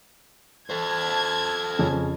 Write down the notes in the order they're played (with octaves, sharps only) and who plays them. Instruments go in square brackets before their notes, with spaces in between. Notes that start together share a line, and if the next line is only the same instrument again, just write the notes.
[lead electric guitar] A4 C5 [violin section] A5 G#6
[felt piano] F2 [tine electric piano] C#3 C#4